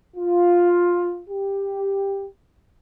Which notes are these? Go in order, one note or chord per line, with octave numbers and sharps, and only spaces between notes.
F4
G4